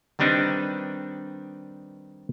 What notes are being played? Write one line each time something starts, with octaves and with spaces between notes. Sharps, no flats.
D#3 G3 C4 D4 D#4 B4